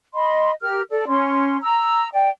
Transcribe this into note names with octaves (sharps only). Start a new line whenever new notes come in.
D#5 B5 C6
G4 A#4 F6
A4 D5
C#4 C6
A#5 E6
D5 G5